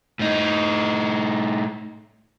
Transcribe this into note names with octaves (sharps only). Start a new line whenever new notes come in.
A2 D#4